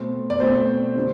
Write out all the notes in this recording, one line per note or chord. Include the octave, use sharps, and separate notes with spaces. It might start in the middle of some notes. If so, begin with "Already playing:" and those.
Already playing: B2 A3 C4
D5
B2 A3 C4 C5
D3 G3 C4